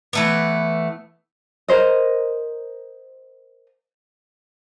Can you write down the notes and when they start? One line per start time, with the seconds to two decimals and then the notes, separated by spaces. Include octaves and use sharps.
0.13 E3 A3 B3
1.68 A#4 C5 D#5